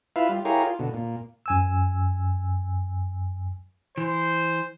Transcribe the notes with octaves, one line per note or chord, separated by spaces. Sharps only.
E4 F4 B4 E5 F5
G3 F4
E4 G4 G#4 A#4 C#5 F5
F4
B2 D3
A#2
F#2 G#5 E6
E3 C5